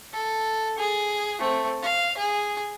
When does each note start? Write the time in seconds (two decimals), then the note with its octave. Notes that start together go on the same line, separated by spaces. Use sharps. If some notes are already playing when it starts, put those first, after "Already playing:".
0.12 A4
0.78 G#4
1.39 A3 C4
1.82 F5
2.18 G#4